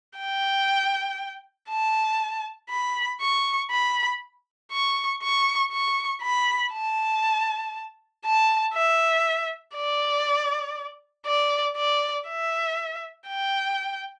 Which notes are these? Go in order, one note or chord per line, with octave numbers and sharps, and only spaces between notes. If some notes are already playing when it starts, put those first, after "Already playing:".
G5
A5
B5
C#6
B5
C#6
C#6
C#6
B5
A5
A5
E5
D5
D5
D5
E5
G5